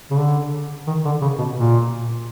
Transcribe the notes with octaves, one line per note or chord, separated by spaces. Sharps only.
C#3
D3
D#3
D3
C#3
B2
A#2